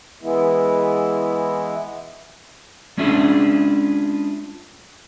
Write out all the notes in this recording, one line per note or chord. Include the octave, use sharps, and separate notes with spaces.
E3 G#3 B3 E4
G#3 C#4 D4 E4 F4 G#4